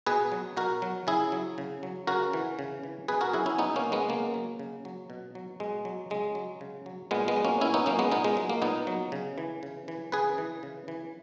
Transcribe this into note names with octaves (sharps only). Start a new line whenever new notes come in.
B2 G#4 B4
F#3
B2 F#4 A#4
F#3
C#3 E4 G#4
F#3
C#3
F#3
C#3 F#4 A#4
E3
C#3
E3
B2 G#4 B4
F#4 A#4
F#3 E4 G#4
C#4 E4
B2 B3 D#4
A#3 C#4
F#3
G#3 B3
C#3 A#3
F#3
C#3
F#3
B2
F#3
B2 G#3
F#3
C#3 G#3
F#3
C#3
F#3
A#2 G#3 B3
G#3 B3
F#3
A#3 C#4
A#2 C#4 E4
B3 D#4
F#3 A#3 C#4
G#3 B3
A#2 B3 D#4
G#3
F#3
A#3
A#2 B3 D#4
F#3
C#3
E3
C#3
E3
C#3 G#4 B4
E3
C#3
E3